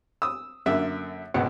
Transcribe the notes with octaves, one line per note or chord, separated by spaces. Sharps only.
D#6 E6
F#2 D3 A#3 E5
G#1 C#2 B2 F#5